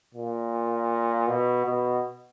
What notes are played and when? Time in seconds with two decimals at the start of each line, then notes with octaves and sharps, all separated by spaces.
0.14 A#2
1.28 B2
1.65 B2